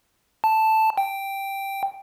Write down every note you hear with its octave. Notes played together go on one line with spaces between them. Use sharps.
A5
G5